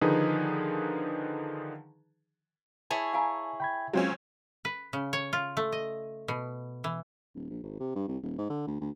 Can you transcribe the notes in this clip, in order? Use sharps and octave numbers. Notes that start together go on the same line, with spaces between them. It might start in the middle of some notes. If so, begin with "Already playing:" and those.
D3 D#3 F3 D#4 G#4 B4
E4 G#4 C#5 A5
F5 G#5 A#5
G5 B5 G#6
F#3 G#3 C4 C#4 F4
B4
C#3
C#5
F4
A3
D#5
B2
E3
D#1
A#1
G#1
C3
G2
C2
D#1
G#2
D3
D2
D2